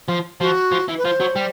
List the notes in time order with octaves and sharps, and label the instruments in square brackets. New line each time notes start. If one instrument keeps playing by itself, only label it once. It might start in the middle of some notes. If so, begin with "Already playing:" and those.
[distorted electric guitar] F3
[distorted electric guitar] F3 [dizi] F#4
[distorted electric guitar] F3
E3
[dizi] B4
[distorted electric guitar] F3 [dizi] C5
[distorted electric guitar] F#3
G3